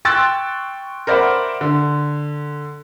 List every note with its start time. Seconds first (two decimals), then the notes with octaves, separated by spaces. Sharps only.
0.05 G5 C6 C#6 E6 F#6 A6
1.07 A#4 C5 D5 E5 F#5 B5
1.61 D3